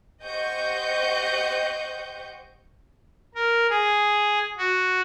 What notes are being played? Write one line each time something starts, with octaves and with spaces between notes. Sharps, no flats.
G4 C5 D#5 F#5 C#6 G6
A#4
G#4
F#4